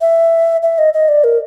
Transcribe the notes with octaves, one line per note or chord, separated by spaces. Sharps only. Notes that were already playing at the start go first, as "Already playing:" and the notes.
E5
E5
D#5
D#5
D5
A#4